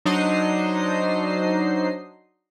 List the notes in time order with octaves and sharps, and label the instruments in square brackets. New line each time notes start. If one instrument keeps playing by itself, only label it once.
[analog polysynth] F#3 D4 D#4 C5 D#5 C7